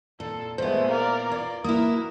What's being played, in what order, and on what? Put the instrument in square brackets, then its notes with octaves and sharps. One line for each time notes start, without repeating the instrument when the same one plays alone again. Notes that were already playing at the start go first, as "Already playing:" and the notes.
[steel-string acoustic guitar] A#2 [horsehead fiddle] A4
[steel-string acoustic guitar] A#2 B3 [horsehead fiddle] G#3 A3 [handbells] C5
[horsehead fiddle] A#4 D5 [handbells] F5
[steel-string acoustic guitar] F4 [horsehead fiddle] D5
[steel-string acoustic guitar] A#3 E4 [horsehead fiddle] F#4 A#4 [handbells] D#6